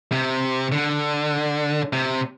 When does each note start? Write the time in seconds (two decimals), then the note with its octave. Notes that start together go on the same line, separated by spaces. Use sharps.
0.12 C3
0.72 D3
1.93 C3